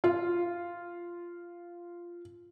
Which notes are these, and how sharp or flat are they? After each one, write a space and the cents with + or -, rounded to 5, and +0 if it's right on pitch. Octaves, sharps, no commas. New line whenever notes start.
F4 -10